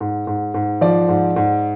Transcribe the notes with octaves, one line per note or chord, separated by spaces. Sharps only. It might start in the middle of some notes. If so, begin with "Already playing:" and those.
G#2
G#2
G#2
F3 D5
G#2
G#2